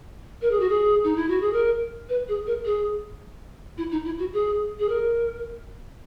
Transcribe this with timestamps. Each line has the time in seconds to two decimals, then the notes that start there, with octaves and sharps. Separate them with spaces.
0.42 A#4
0.51 G#4
0.60 F#4
0.69 G#4
1.04 D#4
1.16 E4
1.29 F#4
1.41 G#4
1.53 A#4
2.09 B4
2.28 G#4
2.47 A#4
2.65 G#4
3.78 E4
3.91 D#4
4.05 E4
4.19 F#4
4.33 G#4
4.79 G#4
4.89 A#4